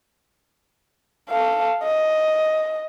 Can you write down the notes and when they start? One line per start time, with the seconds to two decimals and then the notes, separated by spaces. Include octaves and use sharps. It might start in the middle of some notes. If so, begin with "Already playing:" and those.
1.29 A4 F5
1.84 D#5